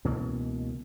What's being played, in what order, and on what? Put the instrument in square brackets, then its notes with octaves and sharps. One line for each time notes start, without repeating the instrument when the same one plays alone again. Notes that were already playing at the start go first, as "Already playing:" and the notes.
[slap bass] C#2 B2 E3 A#3